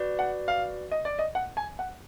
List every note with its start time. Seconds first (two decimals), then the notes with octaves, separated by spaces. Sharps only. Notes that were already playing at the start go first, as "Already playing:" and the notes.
Already playing: F#4 B4 D5
0.19 F#5
0.48 F5
0.91 D#5
1.05 D5
1.19 D#5
1.35 F#5
1.57 G#5
1.79 F#5